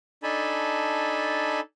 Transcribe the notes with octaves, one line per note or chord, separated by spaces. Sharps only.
D4 D#4 A4 G#5 A5 B5